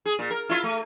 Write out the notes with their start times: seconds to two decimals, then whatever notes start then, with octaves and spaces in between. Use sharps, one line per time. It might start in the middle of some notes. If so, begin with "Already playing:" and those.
0.05 G#4
0.19 A#2
0.31 A#4
0.49 E4 F4
0.64 A3